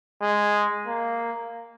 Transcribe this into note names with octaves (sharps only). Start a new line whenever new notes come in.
G#3
A#3